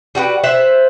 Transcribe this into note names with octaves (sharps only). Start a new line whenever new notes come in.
G3 F#4 G4 B4
C5 E5 F#5